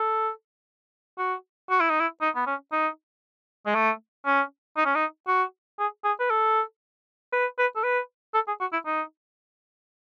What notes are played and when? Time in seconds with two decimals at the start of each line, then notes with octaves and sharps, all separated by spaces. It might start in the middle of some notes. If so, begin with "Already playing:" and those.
Already playing: A4
1.19 F#4
1.70 F#4
1.80 E4
1.90 D#4
2.00 E4
2.21 D#4
2.36 B3
2.47 C#4
2.72 D#4
3.66 G#3
3.75 A3
4.26 C#4
4.77 D#4
4.85 C#4
4.95 D#4
5.28 F#4
5.79 G#4
6.04 G#4
6.19 B4
6.30 A4
7.33 B4
7.58 B4
7.76 A4
7.84 B4
8.34 A4
8.48 G#4
8.61 F#4
8.73 E4
8.86 D#4